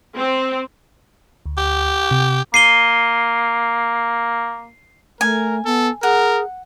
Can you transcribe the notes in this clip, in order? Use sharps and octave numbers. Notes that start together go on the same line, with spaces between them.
C4
D2
G4
C3
A#3 C7 D#7 G7
A3 A#4 G#5
B3 A4
G#4 A#4 F#5